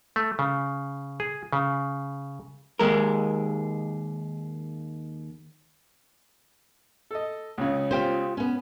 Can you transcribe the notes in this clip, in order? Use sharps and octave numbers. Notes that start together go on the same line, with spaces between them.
A3
C#3
G#4
C#3
D#2 G#3 A#4
A4 D#5
C#2 C#3
F4 G4 C5
B3 C#4